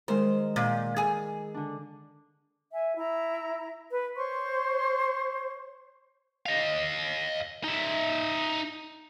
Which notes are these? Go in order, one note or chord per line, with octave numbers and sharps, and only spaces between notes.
D#3 G#3 A#4 C5
A#2
G#4 G#5
D3 D4
E5 G#5
E4 A#5
B4
C5 C#5 C6 C#6
D#5 F5
D#4 E5